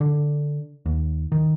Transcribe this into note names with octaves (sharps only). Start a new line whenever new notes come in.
D3
D#2
D#3